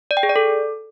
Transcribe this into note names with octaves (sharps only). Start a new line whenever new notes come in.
D5
G5
G#4
D5
A4